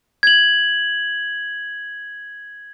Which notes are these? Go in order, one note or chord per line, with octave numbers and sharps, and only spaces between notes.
G#6 F#7